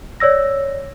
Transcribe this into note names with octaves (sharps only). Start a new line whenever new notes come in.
C#5 D5 E6 A#6